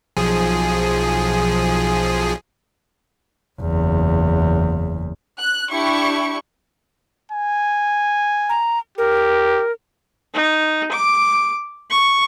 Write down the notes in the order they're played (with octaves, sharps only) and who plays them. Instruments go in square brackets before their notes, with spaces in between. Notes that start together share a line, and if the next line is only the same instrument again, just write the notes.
[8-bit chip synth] B1 F3 G#4
[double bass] F#1 E2
[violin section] F#6
D4 E4 G4 C#6 C#7
[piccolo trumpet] G#5
[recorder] A#5
[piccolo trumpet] G4 [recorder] A#4
[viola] D#4
D6
C#6